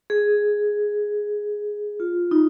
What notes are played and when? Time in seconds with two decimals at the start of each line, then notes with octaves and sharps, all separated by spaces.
0.10 G#4
2.00 F4
2.31 D#4